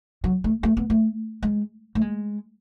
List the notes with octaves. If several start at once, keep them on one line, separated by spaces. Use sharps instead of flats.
F#3
A3
A3
B3
A3
G#3
A3
G#3